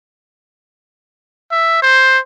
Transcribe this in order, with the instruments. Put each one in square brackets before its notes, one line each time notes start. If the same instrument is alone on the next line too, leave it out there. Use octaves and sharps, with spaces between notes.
[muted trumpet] E5
C5